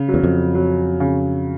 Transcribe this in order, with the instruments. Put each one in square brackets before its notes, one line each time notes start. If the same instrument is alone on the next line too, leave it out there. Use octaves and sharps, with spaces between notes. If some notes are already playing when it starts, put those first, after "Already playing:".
Already playing: [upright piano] C#3
F#3
[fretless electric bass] E2
F2
[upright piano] F#3
C#3